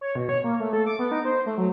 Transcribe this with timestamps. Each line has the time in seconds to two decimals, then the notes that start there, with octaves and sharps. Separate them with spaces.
0.01 C#5
0.15 B2
0.29 C#5
0.44 A#3
0.60 A3
0.73 A4
0.86 D6
0.99 B3
1.11 D#4
1.25 C5
1.46 A3
1.58 F#3